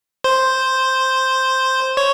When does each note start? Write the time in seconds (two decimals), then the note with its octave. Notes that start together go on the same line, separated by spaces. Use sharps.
0.24 C5
1.97 C#5